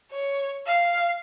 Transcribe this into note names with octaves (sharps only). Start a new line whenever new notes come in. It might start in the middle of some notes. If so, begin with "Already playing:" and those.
C#5
F5